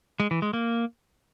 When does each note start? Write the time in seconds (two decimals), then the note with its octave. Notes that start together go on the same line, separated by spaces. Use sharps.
0.20 G#3
0.31 E3
0.42 G#3
0.53 A#3